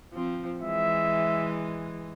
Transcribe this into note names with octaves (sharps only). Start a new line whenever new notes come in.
F3 C4
E3 G#3 E5